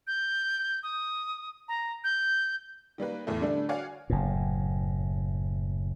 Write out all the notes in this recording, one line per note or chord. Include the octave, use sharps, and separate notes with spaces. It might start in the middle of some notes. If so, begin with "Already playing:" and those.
G6
D#6
A#5
G6
D#3 G3 A#3 B4
E2 A2 A3
D3 G3 A3 D4
F#4 C#5 D5 F5 F#5 G#5
F#1 A2